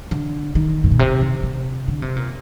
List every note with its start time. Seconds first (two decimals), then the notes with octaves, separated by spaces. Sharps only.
0.11 D3
0.55 D#3
0.84 G#2
0.91 A#2
0.99 C3
1.21 D#3
1.43 C3
1.88 D3
2.02 C3
2.16 A#2